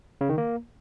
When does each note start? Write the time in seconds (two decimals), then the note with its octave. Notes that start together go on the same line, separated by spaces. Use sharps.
0.21 C#3
0.29 D#3
0.38 A#3